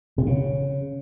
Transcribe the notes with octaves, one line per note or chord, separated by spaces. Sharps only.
C3
C#3